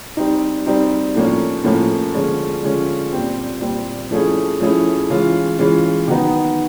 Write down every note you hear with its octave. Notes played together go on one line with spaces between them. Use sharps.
G3 C4 D#4
G3 C4 D#4
A2 F3 A#3 C#4
A2 F3 A#3 C#4
D3 F3 G#3 C#4 F4
D3 F3 G#3 C#4 F4
A#2 G3 C4
A#2 G3 C4
F3 A3 C#4 E4 G#4
F3 A3 C#4 E4 G#4
E3 G#3 C#4 F4
E3 G#3 C#4 F4
D#3 F#3 B3 D#4